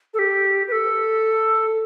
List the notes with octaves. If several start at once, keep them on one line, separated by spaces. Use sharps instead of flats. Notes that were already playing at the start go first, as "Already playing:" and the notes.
A4
G4
B4
A4